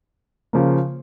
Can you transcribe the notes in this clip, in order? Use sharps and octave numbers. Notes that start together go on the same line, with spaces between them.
C#3 F3 A#3